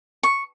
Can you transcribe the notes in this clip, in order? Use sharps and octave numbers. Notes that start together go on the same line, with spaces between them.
C#6